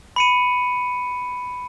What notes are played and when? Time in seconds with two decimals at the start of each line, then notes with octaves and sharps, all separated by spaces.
0.16 B5 C#7 D#7